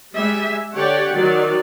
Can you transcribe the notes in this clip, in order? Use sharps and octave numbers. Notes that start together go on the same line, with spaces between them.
G3 G#3 E5 G#5
D3 G4 C#5 D5 F#5 G5
D#3 F#3 D5